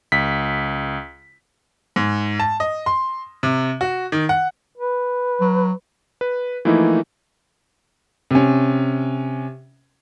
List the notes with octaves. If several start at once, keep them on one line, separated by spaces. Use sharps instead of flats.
C#2 B6
G#2
A5
D#5
C6
C3
F#4
D#3
F#5
B4
F#3
B4
E3 F3 A3 A#3 D#4 E4
C3 C#4